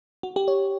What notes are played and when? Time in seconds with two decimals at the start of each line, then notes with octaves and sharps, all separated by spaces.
0.23 F#4
0.36 G4
0.48 C#5